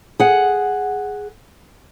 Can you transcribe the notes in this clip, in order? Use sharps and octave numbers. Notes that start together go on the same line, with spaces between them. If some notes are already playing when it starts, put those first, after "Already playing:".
G#4 F#5